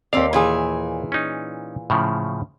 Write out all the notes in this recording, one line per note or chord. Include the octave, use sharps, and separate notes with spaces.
D#2 C4 D5 F5
A#2 E3 G#4
C#4 D#4
A2 C#3 F3